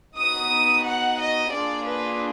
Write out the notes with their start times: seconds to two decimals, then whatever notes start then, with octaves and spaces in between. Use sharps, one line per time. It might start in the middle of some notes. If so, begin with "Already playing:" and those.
0.19 B3 D#4 F#4 D#6
0.88 F#5
1.21 D#5
1.54 A#3 D4 F4 G#4 D5
1.88 B4